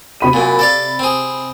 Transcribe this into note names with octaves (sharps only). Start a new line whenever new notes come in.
C3 B5 D#7
F#2 A#2
A4 D5 F5
C4 G#4